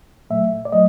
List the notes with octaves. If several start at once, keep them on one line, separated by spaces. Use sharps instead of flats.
A#2 F#3 A3 E5
D5
F#3 A3 D#5